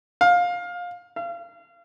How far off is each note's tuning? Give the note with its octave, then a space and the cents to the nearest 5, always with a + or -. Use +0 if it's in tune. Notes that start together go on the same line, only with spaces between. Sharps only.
F5 +20
F5 -30